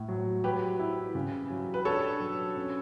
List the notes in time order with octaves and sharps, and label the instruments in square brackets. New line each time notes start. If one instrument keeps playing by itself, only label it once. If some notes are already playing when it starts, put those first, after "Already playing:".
Already playing: [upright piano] A2
F#3
[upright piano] F#3 [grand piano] G4 B4
[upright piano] E4
C#3
F#3
[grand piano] B4
[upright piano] D4 [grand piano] A4 C#5
[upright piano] F#3
C#4